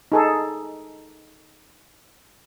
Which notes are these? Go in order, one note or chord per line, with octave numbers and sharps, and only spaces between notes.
D#4 G#4 A4